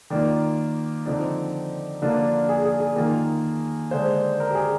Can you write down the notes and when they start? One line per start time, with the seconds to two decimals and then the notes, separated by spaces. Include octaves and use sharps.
0.10 D#3 A#3 F4 D5
1.06 D3 F3 C4 D#4 D5
2.02 D3 F3 A#3 D4 F4
2.49 G#4
2.65 G#4
2.80 G#4
2.96 D#3 A#3 F4
3.91 D3 G#3 D4 C5
4.40 A#4
4.51 G4
4.55 G#4